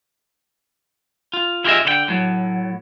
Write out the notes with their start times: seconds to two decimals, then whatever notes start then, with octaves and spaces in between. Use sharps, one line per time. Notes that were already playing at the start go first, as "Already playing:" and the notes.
1.33 F4
1.64 E4 F4 G4 G#4 D#5 E5
1.85 D3 E4 G5
2.08 A2 F#3